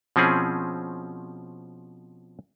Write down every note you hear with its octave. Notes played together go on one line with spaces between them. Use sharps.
B2 F3 C4 C#4 G#4